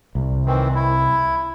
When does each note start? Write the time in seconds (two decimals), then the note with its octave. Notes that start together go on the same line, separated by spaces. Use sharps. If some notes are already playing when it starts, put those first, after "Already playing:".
0.15 C2
0.46 D#3 E3 C4
0.75 E4